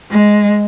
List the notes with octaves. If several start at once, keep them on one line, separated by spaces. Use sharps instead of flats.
G#3